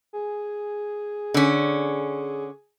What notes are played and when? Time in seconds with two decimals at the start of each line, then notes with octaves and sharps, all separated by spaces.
0.13 G#4
1.34 D3 C#4